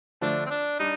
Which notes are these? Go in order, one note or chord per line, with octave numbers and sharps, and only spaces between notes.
D3 F3 A3 D4
C4
D4
G3 D4 D#4